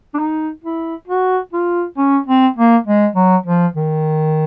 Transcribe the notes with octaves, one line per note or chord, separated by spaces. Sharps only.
D4
D#4
E4
F#4
F4
C#4
C4
A#3
G#3
F#3
F3
D#3